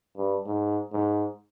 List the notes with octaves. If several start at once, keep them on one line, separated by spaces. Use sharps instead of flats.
G2
G#2
G#2